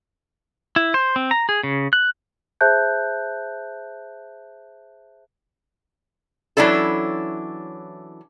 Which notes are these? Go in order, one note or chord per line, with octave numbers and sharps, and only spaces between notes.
E4
C5
C4
A#5
G#4
C#3
F#6
G#4 C5 E5 A5 F#6 G6
E3 F#3 C#4 D4 E4 A4